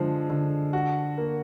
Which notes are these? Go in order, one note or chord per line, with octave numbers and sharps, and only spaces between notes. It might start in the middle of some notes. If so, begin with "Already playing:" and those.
Already playing: D3 F3 G#3
D3
F#4
A#3